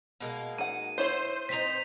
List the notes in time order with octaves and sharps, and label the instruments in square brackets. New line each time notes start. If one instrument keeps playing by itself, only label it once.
[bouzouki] B2 G#3 A#3
[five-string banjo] D#4 F#5 [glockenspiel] D#7
[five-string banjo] B3 E4 C#5 [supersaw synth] C5
[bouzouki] C4 D4 D#4 [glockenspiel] B6 F7